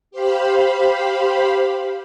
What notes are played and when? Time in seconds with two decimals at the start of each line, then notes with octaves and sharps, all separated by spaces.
0.11 G4 C5 F5 B5